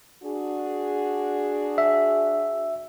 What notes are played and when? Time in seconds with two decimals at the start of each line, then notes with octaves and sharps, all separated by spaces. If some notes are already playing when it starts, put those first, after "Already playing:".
0.24 D4 F#4 G#4
1.78 E5